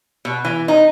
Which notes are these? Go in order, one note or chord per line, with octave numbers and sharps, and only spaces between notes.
B2
E3
D#4